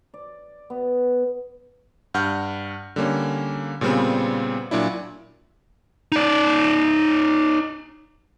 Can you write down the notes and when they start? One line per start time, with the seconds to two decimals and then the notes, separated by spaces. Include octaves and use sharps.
0.14 D5
0.70 B3
2.14 G2 F#5 F6 G6
2.96 D3 G3 A#3 C#4
3.81 A#2 C#3 G3 B3 C4
4.71 A#2 F#3 D4 E4
6.12 D#4 D5